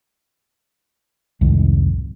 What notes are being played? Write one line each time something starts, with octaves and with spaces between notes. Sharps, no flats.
C2 F2 G#2 D#3